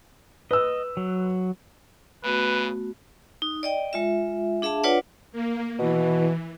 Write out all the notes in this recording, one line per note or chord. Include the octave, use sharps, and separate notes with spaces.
B4 D#5 E6
F#3
C#3 A3 B3 F#4 B4
D#4
D5 D#5 G5
G#3 F4 E5
D4 G#4 E5 F5 A5
D4 F4 B4 C#5 D5 F#5
A#3
B2 E3